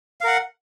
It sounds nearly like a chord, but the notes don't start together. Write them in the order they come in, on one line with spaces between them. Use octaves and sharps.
F5 A#4 F#5